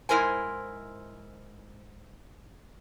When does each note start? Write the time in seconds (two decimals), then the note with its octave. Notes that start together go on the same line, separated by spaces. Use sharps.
0.09 G#2 E4 A#4 C5 G#5